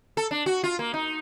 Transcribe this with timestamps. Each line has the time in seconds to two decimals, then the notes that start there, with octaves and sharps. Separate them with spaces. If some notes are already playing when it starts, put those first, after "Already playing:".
0.17 A4
0.31 D4
0.46 F#4
0.64 F4
0.79 A#3
0.94 D#4